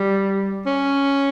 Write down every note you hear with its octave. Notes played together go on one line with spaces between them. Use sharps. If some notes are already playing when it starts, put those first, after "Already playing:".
Already playing: G3
C#4